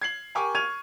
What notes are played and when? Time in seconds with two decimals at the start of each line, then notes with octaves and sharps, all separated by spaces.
0.01 G#6 C7 F#7
0.35 G4 A#4 G5 G#5 C#6 D6
0.55 C#6 F6 G#6 D#7 F7